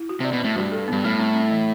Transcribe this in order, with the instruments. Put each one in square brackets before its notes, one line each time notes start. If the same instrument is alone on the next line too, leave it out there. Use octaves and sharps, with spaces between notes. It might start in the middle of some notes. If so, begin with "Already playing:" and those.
Already playing: [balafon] E4
F#4
[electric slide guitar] C3 [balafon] D5
[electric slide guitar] B2
[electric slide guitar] A2 [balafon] C4
[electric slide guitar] G2 [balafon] F#4
[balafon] A4
[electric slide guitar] G2 [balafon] B3
[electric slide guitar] A2 [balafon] G3
[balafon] C4
C4
E3